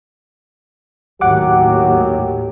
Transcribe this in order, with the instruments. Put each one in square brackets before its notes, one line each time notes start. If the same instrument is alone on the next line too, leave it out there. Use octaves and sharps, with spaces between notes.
[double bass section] D#2 A2 [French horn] F#3 [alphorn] G4 [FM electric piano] F#5 D6